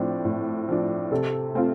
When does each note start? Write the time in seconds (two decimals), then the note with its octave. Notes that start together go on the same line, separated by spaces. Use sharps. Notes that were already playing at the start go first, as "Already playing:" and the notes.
Already playing: A2 F3 C4 D4
0.25 A2
0.69 F3 D4
1.11 C3 A4
1.55 A3 C4 F4